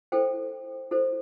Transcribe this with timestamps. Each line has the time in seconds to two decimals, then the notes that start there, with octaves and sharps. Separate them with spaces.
0.12 E4 A4 C5 G5
0.91 E4 A4 C5